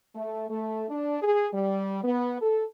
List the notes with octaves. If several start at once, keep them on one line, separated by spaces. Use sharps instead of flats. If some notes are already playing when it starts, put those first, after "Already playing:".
A3
A3
D4
G#4
G3
B3
A4